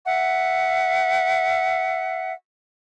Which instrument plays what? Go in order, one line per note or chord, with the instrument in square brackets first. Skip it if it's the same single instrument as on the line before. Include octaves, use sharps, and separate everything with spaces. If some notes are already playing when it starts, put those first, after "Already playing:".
[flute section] E5 F#5